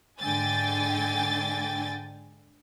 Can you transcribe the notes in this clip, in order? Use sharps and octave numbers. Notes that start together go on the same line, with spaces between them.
G#2 D3 G5 G#5 A6